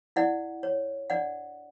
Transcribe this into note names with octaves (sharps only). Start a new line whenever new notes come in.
E4 D5 F#5
C#5
D4 D5 F#5